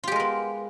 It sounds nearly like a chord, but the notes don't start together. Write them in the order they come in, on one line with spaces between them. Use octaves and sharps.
F4 G4 G#3 A#4 B3